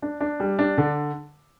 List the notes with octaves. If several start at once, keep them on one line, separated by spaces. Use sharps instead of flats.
D4
D4
G3
D4
D3